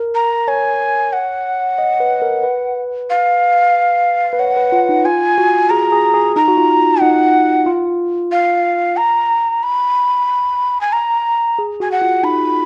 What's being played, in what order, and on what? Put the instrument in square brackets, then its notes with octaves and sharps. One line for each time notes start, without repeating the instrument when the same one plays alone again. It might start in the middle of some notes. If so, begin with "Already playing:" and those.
Already playing: [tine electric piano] A#4
[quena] A#5
[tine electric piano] C#5 [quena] G#5
[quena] F#5
[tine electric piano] D#5
B4
A#4
B4
[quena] F5
[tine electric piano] B4
[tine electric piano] C#5 [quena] F#5
[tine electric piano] B4
F4
D#4
[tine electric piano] F4 [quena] G#5
[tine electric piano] F#4
[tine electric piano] G#4 [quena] A#5
[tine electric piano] G#4
G#4
[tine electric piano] D#4 [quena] A#5
[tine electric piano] F#4
F4
[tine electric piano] D#4 [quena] F#5
[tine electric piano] F4
[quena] F5
A#5
B5
G#5
A#5
[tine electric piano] G#4
[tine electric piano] F#4 [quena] G#5
[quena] F#5
[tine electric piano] F4
[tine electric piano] D#4 [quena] B5